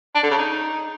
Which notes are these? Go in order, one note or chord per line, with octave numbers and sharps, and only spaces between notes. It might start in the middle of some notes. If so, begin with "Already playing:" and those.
D4
D3
C#3
D#4